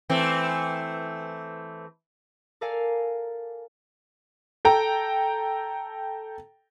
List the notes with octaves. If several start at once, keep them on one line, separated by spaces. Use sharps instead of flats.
E3 A3 C4
A4 A#4 D5 F5 G#5
A4 G5 A#5